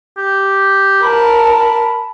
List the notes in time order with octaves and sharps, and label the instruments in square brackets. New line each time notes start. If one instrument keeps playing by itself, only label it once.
[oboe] G4
[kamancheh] A#4 A5 [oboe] B5